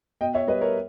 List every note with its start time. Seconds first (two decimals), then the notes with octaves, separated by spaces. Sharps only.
0.21 B2 D#5 G5
0.34 C#5 E5
0.47 G3 B4 D#5
0.61 A#4 C#5